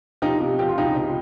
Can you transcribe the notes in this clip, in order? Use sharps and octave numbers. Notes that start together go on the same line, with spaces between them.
F3 D#4 G4
C3
F3 G4
F4
C#2 D#4 G4
F3